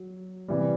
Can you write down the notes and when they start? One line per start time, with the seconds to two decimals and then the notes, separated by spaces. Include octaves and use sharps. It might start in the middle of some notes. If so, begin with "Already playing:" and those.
Already playing: F#3
0.48 C3 E3 G3